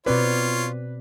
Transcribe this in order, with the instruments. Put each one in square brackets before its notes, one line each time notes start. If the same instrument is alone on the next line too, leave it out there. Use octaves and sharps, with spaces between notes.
[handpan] B2 C4 D5 [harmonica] F4 C#5 [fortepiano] B4